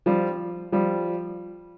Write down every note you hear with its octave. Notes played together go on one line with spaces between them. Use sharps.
F3 G3
F3 G3